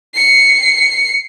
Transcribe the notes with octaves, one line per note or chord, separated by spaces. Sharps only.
C7 C#7